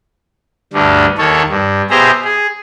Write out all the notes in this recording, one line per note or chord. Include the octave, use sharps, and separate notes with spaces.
D2 G2 D3
D#2 D#3 A4 C#5
G2
B2 G4 G#4 C5 E5 A#5
G#4